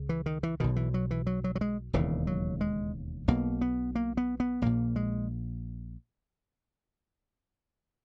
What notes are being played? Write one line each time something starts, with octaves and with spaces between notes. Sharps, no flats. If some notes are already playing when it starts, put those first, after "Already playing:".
Already playing: C#2 C#3
E3
D#3
E3
B1 B2 D#3
E3
F#3
E3
F#3
F#3
F#3
G#3
E1 D#2 C#3 E3
F#3
G#3
B1 B2 A#3
B3
A#3
B3
B3
A#1 A#2 A#3
G#3